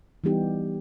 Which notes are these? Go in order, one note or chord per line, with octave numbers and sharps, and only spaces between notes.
E3 G3 B3 D#4 G4